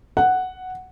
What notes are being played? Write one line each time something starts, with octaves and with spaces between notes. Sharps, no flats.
F#5